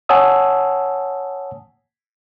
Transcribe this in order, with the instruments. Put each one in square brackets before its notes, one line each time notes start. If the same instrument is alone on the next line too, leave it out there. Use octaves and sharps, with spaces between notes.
[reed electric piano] C#5 F#5 G#5 A5 D#6 E6